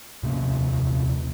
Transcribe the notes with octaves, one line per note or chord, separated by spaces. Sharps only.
D#1 C3 A#3 C#4